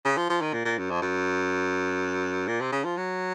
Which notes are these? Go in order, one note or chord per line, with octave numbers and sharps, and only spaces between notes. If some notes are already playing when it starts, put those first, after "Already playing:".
C#3
F3
F3
D#3
A#2
A#2
F#2
F2
F#2
A#2
C3
C#3
F3
F#3